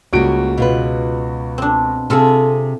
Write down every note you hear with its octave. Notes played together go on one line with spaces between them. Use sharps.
C#2 G3 A#3 F#4 D7
B2 F4 B4
C4 D4
C3 C4 F4 G#4 A4